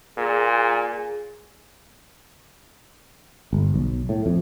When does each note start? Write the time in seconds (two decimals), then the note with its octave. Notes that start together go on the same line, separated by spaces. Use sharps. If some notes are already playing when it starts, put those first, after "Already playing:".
0.18 A#2 G#4
3.53 G1
3.74 B1
4.09 A2
4.26 F2